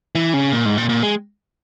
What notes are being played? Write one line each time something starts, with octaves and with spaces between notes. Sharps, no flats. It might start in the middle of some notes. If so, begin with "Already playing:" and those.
E3
C#3
A#2
G#2
A#2
A#2
G#3